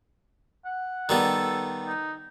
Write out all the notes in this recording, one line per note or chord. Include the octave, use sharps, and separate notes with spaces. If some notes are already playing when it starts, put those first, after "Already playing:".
F#5
D#3 G3 B3 A4
D#4